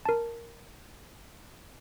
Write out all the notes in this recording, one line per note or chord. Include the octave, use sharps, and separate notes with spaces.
A#4 A5